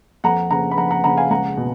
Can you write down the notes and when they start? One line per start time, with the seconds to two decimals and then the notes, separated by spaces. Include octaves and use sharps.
0.24 F2 F#5 A#5
0.51 C#3 F#5 A#5
0.71 B5
0.78 F2 F#5 A#5
0.91 F#5 A#5
1.04 C#3 F#5 A#5
1.17 F5 G#5
1.30 C#2 F#5 A#5
1.57 B2